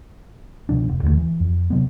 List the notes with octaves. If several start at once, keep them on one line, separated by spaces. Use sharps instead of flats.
C#2 B2 F3 D4
F1
D#2 D3 F#3 A3
E3
F2
C3 F#3 B3